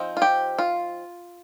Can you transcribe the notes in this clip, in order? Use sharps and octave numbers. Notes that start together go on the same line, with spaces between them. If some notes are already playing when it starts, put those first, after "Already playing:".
Already playing: F3 C4 D#4
F4
G4
F4